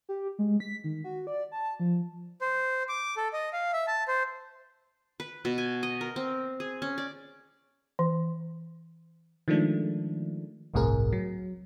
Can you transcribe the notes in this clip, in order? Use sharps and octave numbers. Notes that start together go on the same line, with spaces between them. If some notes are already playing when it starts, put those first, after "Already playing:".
G4
G#3
B6
D#3
F#4
D5
A5
F3
C5
D6
A4
D#5
F5
E5
A5
C5
B4
B2
G#5
D#5
A#4
C4
G#4
C#4
D5
E3
D#3 F3 G#3 A3 D4
G1 C2 A2 C3 G#4 A#4
F#3